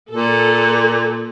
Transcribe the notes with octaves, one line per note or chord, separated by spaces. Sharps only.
A#2 A4